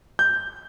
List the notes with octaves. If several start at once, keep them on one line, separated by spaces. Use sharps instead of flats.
G6